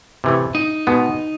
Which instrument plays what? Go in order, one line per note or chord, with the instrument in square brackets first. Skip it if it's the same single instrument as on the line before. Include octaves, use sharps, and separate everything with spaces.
[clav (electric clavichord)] C3 E3 A3
[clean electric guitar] D#4
[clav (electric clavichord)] B2 G#3 B3